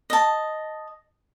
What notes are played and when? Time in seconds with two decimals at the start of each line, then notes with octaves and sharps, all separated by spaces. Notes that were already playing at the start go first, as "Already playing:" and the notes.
0.10 D#5 A5